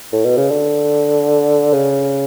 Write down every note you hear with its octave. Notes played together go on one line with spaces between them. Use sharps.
A2
B2
C#3
D3
C#3